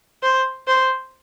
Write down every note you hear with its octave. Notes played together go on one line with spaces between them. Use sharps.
C5
C5